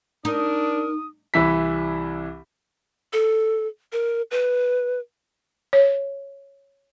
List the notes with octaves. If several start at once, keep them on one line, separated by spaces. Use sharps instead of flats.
D4 D#4 A#4 D#6
C2 E3 E4 B6
A4
A#4
B4
C#5